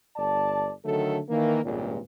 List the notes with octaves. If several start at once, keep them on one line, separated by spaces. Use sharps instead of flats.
G1 D5 A5
D3 D#3 F#3 A3 A4
D#3 E3 A#3
G#1 C#2 G2 A#2